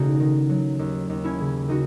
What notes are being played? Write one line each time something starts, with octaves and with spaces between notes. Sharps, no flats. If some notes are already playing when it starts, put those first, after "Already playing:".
Already playing: E1 C#3 A3 C#4 D#4 F#4
D#3
F#3
D#2
D#2
C#4 E4
C#3
D#3 D#4 F#4